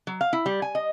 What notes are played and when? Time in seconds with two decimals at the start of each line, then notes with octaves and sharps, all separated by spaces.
0.07 F#3
0.21 F5
0.33 E4
0.46 G3
0.62 G#5
0.75 D#5